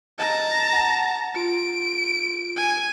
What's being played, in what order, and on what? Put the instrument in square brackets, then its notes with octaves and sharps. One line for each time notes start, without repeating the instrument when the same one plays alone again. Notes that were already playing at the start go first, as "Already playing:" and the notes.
[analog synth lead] D#5 [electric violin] A5 A#5
[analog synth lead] F#5
[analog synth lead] F4 [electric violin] D7
[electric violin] G#5